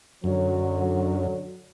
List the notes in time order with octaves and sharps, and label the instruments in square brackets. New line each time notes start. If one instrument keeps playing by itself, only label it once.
[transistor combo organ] F#2 [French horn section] D3 F#3